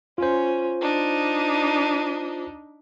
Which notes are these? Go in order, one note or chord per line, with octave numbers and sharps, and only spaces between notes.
C#4 F4 C5
D4 D#4